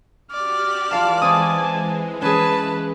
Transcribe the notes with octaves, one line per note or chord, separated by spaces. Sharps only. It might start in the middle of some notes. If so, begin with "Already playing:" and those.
F#4 G4 D5 F6
E3 G#3 F4 F5 A5
C4 G#5 A5 D#6
C#4 G#4 B4 A5